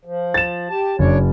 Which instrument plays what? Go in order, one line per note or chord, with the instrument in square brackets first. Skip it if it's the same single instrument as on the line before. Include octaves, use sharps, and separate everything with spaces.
[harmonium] F3
[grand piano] A6 E7
[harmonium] G4 A5
[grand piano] F#1 [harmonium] D4 C#5